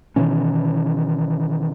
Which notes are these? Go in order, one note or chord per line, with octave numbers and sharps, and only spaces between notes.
B2 D#3 E3 C#4